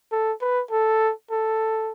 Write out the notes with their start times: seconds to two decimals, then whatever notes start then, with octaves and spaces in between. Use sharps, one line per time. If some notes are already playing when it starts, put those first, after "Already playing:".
0.12 A4
0.41 B4
0.71 A4
1.31 A4